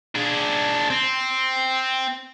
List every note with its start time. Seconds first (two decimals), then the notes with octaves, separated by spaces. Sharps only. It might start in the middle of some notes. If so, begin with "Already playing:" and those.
0.15 D4 G#4
0.90 C4